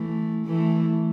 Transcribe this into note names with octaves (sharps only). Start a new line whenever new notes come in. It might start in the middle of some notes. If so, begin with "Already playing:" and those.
Already playing: E3 A3
E3 A3